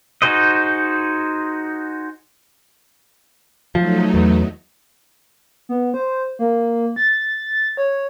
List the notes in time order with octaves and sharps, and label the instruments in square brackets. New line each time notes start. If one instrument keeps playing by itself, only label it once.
[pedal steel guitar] D#4 F#4 G#4 C5 D#5
[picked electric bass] F3 [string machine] F#3 A3 D#4
[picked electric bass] E2
[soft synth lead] B3
C5
A#3
A6
C#5